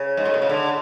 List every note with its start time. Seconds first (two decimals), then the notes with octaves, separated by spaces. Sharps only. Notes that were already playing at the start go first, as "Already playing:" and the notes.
Already playing: C#3
0.17 G#2
0.25 A2
0.34 B2
0.42 C#3
0.49 D3